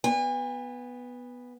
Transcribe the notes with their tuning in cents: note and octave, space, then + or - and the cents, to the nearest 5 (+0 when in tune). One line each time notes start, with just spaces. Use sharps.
B3 +0 G#5 -40